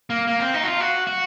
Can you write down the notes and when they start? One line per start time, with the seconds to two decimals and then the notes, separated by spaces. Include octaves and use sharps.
0.10 A#3
0.27 A#3
0.40 C4
0.54 D#4
0.63 F#4
0.67 F4
0.80 F#4
1.07 F#4